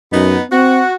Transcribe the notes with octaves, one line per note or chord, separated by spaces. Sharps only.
F#2 B3 D#4
C4 F#4